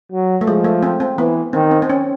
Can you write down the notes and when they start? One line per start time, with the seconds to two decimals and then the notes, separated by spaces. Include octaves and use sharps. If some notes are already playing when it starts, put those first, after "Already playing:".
0.12 F#3
0.41 A3
0.47 F3 G#3
0.65 A3
0.83 C4
1.00 C4
1.18 E3 B3
1.53 D#3 C4
1.71 C4
1.82 C4
1.90 C#4